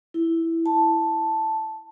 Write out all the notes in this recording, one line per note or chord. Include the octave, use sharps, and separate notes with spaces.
E4
A5